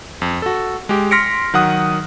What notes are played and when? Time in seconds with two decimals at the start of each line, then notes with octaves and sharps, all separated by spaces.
0.22 F2
0.42 F#4 A4
0.89 G#3 G4
1.11 C6 F6 A#6 B6 C#7 D7
1.54 D#3 F#3 F#5 D#6 F#6